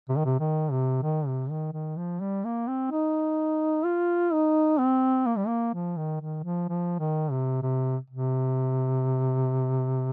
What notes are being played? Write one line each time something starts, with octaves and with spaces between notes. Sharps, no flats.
C3
D#3
C3
D#3
C3
D#3
C3
D#3
D#3
F3
G3
A#3
C4
D#4
F4
D#4
C4
A#3
G3
A#3
F3
D#3
D#3
F3
F3
D#3
C3
C3
C3